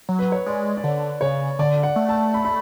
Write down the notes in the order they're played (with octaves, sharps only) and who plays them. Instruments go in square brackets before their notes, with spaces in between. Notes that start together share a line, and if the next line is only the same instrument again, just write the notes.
[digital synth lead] F#3
[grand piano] B4
C#5
[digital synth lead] G#3 [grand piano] D5
[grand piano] D5
[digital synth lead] D3 [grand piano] C#5
[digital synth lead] C#3 [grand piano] C#5
[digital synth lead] D3 [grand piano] D5
[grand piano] F#5
[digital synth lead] A3
[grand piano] A5
B5
B5